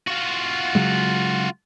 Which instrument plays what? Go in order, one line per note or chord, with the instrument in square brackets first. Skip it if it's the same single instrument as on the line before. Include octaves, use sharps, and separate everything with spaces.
[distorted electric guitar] F4 F#4
[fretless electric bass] C#3 F#3 G#3